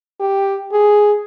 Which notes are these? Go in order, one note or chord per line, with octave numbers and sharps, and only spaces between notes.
G4
G#4